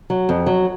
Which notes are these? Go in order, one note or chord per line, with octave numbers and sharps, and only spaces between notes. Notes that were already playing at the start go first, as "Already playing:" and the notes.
F#3
F2
F#3